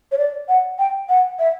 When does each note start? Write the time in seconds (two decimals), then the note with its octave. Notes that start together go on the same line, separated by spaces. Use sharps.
0.12 C#5
0.18 D5
0.49 F#5
0.79 G5
1.09 F#5
1.39 E5